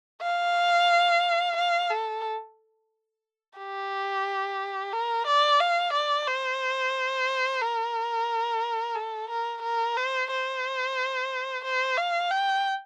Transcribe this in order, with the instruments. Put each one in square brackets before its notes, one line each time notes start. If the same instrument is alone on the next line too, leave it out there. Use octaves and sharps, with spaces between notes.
[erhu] F5
F5
A4
G4
A#4
D5
F5
D5
C5
A#4
A4
A#4
A#4
C5
C5
C5
F5
G5